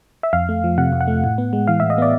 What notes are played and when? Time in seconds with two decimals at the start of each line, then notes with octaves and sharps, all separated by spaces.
0.23 E5
0.33 F2 F5
0.49 A3
0.64 F3
0.78 C3 F#5
0.93 F2
1.01 F#5
1.08 A3
1.24 A2
1.38 B3
1.53 G#3
1.68 E3 F5
1.80 A2 E5
1.90 D#5
1.98 B3 D5